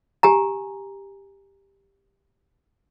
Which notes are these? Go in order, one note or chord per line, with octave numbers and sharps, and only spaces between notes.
G4 G#5 A#5